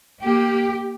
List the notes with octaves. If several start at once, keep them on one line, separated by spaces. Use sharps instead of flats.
A#3 G4